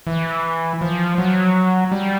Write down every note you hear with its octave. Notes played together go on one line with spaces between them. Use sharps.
E3
F3
F#3
G3